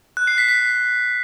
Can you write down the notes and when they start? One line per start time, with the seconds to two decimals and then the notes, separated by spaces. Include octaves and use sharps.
0.17 F#6
0.27 C7
0.38 B6
0.48 B6